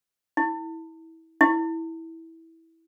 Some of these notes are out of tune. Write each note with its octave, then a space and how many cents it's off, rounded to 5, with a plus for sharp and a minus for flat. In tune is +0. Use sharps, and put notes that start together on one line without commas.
E4 -25
E4 -15